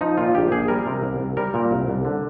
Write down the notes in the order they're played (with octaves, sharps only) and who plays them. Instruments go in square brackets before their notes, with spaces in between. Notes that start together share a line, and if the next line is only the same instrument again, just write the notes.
[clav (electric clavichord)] F3 D#4
A#2 F4
A#1 G4
A#1 G#4
G3 A#4
C3
C2
C2
G3 A#4
A#2
C2
C2
D3